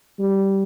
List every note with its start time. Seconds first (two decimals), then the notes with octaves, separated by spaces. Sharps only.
0.19 G3